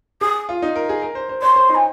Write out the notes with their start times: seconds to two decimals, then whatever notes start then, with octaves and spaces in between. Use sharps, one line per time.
0.21 G#4 D#6
0.49 F4
0.62 D#4
0.76 A#4
0.89 G#4
1.02 A#4
1.15 C5
1.29 C5
1.42 C#5 C6
1.56 C5
1.69 D#4
1.75 G#5